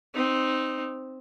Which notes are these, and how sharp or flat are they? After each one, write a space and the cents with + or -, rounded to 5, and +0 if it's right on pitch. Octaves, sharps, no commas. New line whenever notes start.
C4 +0 D#4 -10